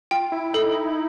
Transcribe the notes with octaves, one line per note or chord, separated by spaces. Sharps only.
F4 G5
E4
D#4 A4